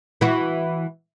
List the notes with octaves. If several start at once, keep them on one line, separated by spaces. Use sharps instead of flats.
E3 F#4